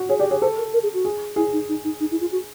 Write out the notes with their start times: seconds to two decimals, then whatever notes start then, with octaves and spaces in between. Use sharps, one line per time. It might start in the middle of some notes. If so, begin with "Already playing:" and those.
Already playing: F#4
0.09 G#4 C#5
0.19 G4 D5
0.31 G#4 C#5
0.42 A4 C5
0.58 A#4
0.74 A#4
0.83 G#4
0.94 F#4
1.05 G#4
1.36 E4 G#4
1.53 D#4
1.69 D#4
1.84 D#4
2.00 D#4
2.11 E4
2.21 F4
2.32 F#4